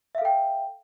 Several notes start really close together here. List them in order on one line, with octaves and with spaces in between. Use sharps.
E5 F5 A4 G5